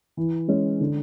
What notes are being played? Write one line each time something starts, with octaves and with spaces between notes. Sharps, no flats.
E3
G#3 C#4
D3